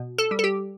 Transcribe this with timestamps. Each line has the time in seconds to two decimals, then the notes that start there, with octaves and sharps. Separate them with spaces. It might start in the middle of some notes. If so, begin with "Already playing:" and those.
Already playing: B2
0.18 A4
0.31 G3
0.39 A4
0.44 G4